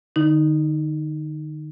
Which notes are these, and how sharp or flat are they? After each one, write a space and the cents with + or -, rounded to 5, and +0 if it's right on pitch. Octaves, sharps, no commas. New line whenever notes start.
D3 +45 D#4 +0